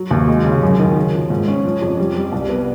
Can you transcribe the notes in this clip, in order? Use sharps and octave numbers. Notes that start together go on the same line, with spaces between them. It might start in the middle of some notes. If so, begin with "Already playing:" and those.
Already playing: F#3
D#2
G#3
C#3
F#2
D#3
C#3
F3
G#2
C#4
F3
F2
G3
G3
C2
B3